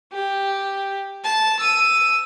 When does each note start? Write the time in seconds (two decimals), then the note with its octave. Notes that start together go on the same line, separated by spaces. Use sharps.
0.13 G4
1.24 A5
1.60 E6 D#7